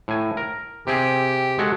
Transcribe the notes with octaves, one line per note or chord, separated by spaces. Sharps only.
A2 G#5
A#4
C3 C4 G4 G#4
G#3 F#4 A4